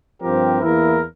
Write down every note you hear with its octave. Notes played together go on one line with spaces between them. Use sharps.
G2 F3 C4 G4 A#4
E2 E3 A#3 E4 A#4